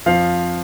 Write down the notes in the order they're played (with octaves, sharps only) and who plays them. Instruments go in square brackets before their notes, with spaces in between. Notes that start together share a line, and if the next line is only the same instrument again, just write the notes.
[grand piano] F2 F3 F5